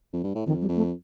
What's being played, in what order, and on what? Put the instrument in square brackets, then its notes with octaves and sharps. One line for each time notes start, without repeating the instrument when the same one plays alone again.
[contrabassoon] F2
G2
A2
[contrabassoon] F2 [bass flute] D#3
[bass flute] G3
[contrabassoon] F2
[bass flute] A3